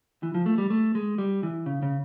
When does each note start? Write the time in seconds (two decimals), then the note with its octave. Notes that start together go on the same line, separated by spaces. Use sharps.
0.23 E3
0.34 F3
0.46 A3
0.58 G3
0.70 A3
0.95 G#3
1.18 G3
1.43 E3
1.66 C#3
1.82 C#3